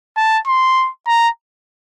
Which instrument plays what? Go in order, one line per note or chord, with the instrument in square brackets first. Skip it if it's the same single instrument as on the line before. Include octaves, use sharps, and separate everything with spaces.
[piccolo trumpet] A5
C6
A#5